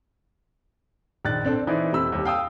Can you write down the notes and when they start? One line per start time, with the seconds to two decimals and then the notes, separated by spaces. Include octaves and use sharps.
1.25 A#1 D#3 F#6 A6
1.45 C4 D4 A4
1.67 E3 D#4 E4 C5 D5
1.93 F1 C3 C4 B5 E6
2.12 D#2 G3
2.25 F5 G5 D#6 E6